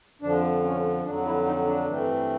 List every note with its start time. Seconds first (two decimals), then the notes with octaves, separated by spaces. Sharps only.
0.22 F2 D3 F3 D4
0.64 C#4
1.05 F2 D3 F#3 D4
1.25 E4
1.46 D#4
1.67 D4
1.88 G2 E3 A3 C4